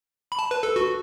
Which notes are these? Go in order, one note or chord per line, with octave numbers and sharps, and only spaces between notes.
B5
A5
B4
A4
F#4